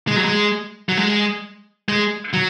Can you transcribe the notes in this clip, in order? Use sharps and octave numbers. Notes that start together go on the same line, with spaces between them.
G#3
F#3
G#3
F#3
G#3
G#3
F#3